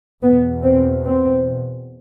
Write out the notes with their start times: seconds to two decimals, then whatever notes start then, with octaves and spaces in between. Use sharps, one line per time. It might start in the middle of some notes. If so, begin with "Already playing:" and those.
0.23 E2 B2 B3
0.64 C4
1.05 C4